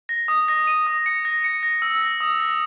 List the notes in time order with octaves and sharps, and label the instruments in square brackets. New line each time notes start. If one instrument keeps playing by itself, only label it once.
[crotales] A#6
D#6
A#6
D#7
D#6
C#7
A#6
C#7
A#6
E6
A#6
D#6
A#6